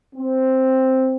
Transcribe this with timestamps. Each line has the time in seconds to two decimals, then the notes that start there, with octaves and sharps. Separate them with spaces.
0.15 C4